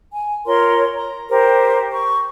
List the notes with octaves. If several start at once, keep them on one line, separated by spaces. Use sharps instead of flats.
G#5
F4 A#4 C#5 C6
A#5
G4 A#4 C5
C#6